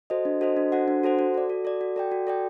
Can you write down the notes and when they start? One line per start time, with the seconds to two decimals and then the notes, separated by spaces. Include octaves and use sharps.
0.10 F#4 A4 C5 D#5
0.25 D4
0.41 F#4 A4 C5 D#5
0.57 D4
0.72 F#4 A4 C5 F#5
0.88 D4
1.03 F#4 A4 C5 F#5
1.19 F#4
1.34 A4 D5
1.50 F#4
1.65 A4 D5
1.81 F#4
1.96 A4 D5 G5
2.12 F#4
2.27 A4 D5 G5